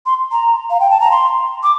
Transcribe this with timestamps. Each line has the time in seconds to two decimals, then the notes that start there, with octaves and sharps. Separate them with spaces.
0.06 C6
0.32 A#5
0.70 F5
0.80 G5
0.90 A5
1.01 A#5
1.11 C6
1.63 D6